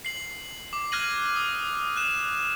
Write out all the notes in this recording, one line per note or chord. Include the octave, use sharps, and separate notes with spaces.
C7 F#7
D6
F6 F#6 G#6 A#6 D#7 F#7
D#6
F#6 E7